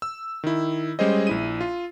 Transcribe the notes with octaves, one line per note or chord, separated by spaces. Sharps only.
E6
D#3 E4
G3 G#3 C#4 G#4 C5 D#5
A#1 E4 D#7
F4